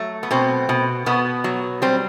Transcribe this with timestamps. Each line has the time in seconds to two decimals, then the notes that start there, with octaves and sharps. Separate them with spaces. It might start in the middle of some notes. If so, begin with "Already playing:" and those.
Already playing: F#3 A3
0.23 B3
0.31 B2 C4
0.69 B2
1.06 B2 B3
1.44 F#3
1.82 G3 C4